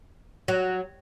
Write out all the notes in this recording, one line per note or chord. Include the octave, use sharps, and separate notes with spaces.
F#3